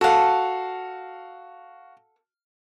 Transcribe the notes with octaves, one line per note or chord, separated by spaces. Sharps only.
F#4 A4 F5 F#5